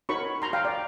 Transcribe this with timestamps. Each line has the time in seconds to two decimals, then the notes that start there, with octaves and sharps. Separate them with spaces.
0.09 D#4 F#4 A#4 C#5 B5 C#6
0.42 A#5 C6
0.53 F5 G5
0.65 D5